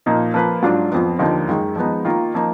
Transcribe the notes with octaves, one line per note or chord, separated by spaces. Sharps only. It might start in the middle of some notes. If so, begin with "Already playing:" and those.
A#2 F3 A#3 D#4
F3 A#3 F4 B4
G#2 F#3 D4 F4
F2 F3 B3 F4
D#2 D3 F3 A#3 D#4
F#2 D#3 G#3
F3 G#3 B3 D#4
D#3 A#3 F4 A#4
F3 A#3 D#4